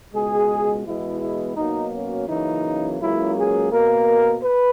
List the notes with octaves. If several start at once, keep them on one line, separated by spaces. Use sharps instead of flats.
C#2 B2 G#3 G#4
E2 B2 G#3 B3 E4
E4
B2 F#3 A#3 D#4
C#4
F#2 C#3 E3 A#3 D#4
C#2 C#3 F#3 A#3 E4
G#4
B2 A#3 A#4
B4